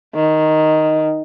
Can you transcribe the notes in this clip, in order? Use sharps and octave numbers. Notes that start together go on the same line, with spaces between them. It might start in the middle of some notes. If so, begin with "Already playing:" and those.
D#3